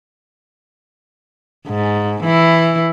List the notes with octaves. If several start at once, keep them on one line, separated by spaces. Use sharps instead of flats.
G#2
E3 E4